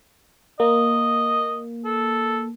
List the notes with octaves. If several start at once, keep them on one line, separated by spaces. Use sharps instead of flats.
A#3 D#5
A4